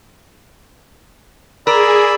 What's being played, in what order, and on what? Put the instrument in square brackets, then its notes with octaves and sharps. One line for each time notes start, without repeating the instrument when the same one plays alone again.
[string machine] G#4 [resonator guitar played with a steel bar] A#4 [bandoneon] D5 B5 E6